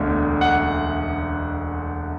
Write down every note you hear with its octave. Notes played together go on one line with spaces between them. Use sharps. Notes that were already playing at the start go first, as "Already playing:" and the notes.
Already playing: E1 D2 D3
F#5